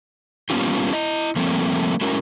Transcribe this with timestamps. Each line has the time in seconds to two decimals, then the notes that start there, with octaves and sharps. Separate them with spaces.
0.50 G3 A#3 B3 C#4 F4 G4
0.93 E4 D#5
1.36 F3 G3 A3 A#3 C4
2.01 G#3 A3 C#4 E4 F#4 A#4